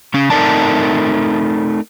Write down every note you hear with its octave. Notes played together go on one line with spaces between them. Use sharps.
C#3 C#4
A3 C4 D#4 A#4 D5 A5